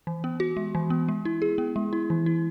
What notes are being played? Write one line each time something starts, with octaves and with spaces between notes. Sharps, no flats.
E3
B3
F#4
G#3
E3
B3
G#3
E4
G#4
B3
G#3
E4
E3
E4